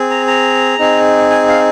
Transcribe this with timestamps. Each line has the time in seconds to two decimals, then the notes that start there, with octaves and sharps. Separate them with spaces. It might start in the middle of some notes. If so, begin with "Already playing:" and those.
Already playing: C4 G#4
0.10 A#5
0.27 A#5
0.79 C4 D#4 G#4
1.30 G#5
1.48 F5